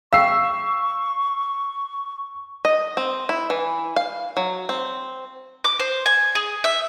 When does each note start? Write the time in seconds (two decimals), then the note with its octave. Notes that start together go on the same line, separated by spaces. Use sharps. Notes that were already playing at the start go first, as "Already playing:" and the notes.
0.13 F5 G5 C#6 E6 C7
2.65 D#5
2.97 C4
3.29 E4
3.50 E3
3.96 F5
4.37 F#3
4.69 C4
5.64 D6
5.80 C5
6.06 G#5
6.35 G#4
6.64 E5